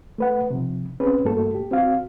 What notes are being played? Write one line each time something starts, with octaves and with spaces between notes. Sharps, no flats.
A3 B4 F#5
C3 F3
C4 C#4 G#4 B4
G2 A3 A#3 F#4 A4
G4
C4 F#4 F5